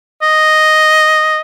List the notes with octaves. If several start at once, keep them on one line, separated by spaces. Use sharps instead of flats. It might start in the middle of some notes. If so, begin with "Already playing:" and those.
D#5